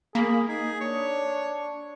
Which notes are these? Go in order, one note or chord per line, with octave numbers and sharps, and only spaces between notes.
A#3 G#4 B5
D#4 G#4
D4 C#5